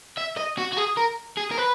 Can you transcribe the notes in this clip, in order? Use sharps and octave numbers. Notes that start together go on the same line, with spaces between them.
E5
D#5
F#4
F#4
G#4
A#4
G#4
A#4
B4